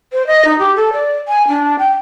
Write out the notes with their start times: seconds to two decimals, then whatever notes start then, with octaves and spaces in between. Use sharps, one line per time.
0.12 C5
0.27 D#5
0.45 D#4
0.59 G4
0.76 A4
0.93 D5
1.28 G#5
1.48 D4
1.79 G5